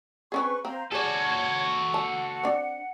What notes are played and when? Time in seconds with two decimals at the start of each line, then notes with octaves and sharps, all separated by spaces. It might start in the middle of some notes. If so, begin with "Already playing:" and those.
0.32 C4 C#4 G#4 B4 C#6
0.65 C4 C5 F5 A#5
0.92 F#4 G#4 A4 C#5 D5 G#6
1.94 F#5 A5
2.43 C4 D4